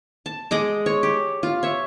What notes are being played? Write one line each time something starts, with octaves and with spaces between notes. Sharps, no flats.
A5
G#3 D#5 D6
C#5
G4
F4
C#5 E5